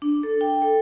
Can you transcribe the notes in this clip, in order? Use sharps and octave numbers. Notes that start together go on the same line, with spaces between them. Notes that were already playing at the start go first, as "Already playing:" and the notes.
D4
A4
G5
A4